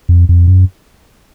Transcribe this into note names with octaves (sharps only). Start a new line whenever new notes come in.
F2
F2
F#2